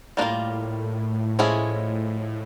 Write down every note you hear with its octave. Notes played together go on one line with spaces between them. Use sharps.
A2 G3 A#3 D4 F4 A#4
F3 G#3 C#4 E4 G#4